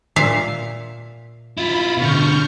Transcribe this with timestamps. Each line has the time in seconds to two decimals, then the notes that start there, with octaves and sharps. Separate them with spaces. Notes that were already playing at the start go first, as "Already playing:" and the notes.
0.16 A#2 E5 F5
1.58 E4 F4 B5
1.97 B2 D3 C#6 F6 G6